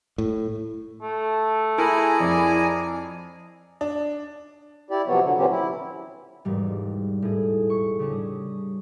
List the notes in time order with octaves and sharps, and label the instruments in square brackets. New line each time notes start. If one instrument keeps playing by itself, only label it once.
[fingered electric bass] A2
[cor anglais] A3
[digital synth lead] E4 [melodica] G#4 G#5 A#5 [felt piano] A#4
[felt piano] F2 [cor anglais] D5
[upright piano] D4
[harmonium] E4 G4 D5
C3 F3 F#3 B3 C#5
D3 F#3
A#2 E3 F#3 C4 C#4 G4
E4
[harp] E1 G#2 G3
A2 G#4
C#6
C#3 G3 C#4 D4
D#6